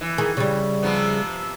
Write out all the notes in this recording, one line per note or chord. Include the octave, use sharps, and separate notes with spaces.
E3
D#3 G#4
C#3 G3
C3 F3 B3